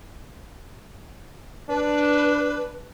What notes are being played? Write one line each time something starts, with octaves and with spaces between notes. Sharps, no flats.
D4 B4